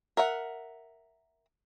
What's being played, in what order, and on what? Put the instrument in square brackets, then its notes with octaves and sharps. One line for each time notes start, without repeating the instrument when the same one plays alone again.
[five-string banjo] A#4 E5 F#5